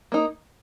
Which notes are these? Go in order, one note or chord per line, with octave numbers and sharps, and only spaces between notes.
A#3 D#4